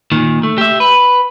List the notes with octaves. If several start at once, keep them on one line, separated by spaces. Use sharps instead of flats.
A#2 D#3
A3
G4 E5
B4